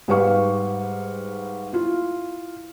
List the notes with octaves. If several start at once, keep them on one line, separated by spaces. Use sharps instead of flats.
G#2 G3 B4 F5 C#6
E4 F4